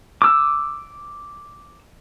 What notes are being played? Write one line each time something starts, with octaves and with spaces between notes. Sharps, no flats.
D6 E6